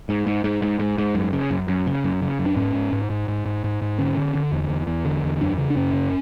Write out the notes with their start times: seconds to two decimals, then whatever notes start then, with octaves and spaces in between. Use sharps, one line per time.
0.09 G#2
0.27 G#2
0.44 G#2
0.62 G#2
0.79 G#2
0.98 G#2
1.15 F#2
1.33 C#3
1.51 F#2
1.68 F#2
1.87 C#3
2.04 F#2
2.22 C#3
2.39 F#2
2.46 D4
2.57 G#2 C#4
2.74 G#2
2.93 G#2
3.10 G#2
3.28 G#2
3.46 G#2
3.64 G#2
3.82 G#2
3.98 D3 C#4
4.17 D3
4.35 D3
4.52 E2
4.69 E2
4.87 E2
5.05 D3
5.23 E2
5.41 F#2 D4
5.58 C#3
5.70 D4
5.76 F#2 C#4
5.93 C#3